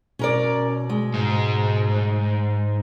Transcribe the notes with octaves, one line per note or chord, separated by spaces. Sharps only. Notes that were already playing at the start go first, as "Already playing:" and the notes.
B2 C#4 A#4 D5
G#3
G#2